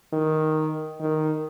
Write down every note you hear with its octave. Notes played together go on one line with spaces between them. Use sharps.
D#3
D#3